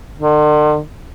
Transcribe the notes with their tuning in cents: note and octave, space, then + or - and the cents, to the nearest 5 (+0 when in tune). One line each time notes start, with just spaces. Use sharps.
D3 +45